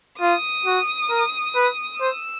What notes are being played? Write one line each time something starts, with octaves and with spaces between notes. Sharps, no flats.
F4 D#6
F#4
A#4
B4
C5 E6